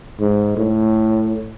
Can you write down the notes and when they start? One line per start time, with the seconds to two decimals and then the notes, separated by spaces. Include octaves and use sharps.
0.20 G#2
0.57 A2